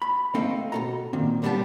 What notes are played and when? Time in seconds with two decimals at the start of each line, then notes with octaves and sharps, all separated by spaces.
0.02 B5
0.34 A3 C4 D#4 A4 F5 G5
0.72 B2 A4 A#5
1.13 A#2 D#3 C4
1.42 C#2 D3 G3 B3 G4 A5